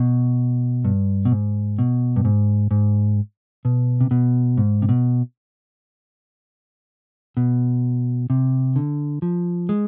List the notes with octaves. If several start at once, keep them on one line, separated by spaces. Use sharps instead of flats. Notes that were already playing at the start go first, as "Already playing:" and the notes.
Already playing: B2
G2
B2
G#2
B2
G2
G#2
G#2
B2
C3
B2
G#2
C3
B2
B2
C3
D3
F3
G#3